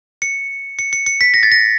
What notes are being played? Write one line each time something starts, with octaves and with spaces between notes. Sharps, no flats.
C#7
C#7
C#7
C#7
B6
A#6
A6
A#6